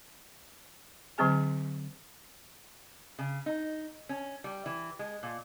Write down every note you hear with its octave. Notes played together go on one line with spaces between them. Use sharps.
D3 F#3 C4 G#4 G#5
C#3
D#4
C#4
G3
E3
G#3
A#2